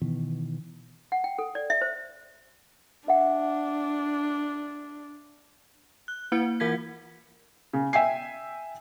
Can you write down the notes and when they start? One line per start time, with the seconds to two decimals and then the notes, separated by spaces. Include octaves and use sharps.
0.02 B2 D#3 E3 B3
1.12 F#5
1.24 G5
1.39 A4
1.55 D5
1.70 E5
1.82 C5
3.08 D4 E5 F#5
6.08 F#6
6.32 A#3 E4 F#5 C#7
6.60 E3 A#4 F#5 G#6 B6
7.73 C#3
7.93 E5 G5 G#5 C7